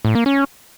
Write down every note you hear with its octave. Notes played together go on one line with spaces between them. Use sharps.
A2
A#3
C#4